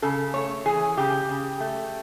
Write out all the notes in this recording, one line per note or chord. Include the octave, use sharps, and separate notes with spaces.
C#3 A4
A3 C#5
E3 G#4
C#3 G4
C#3
A3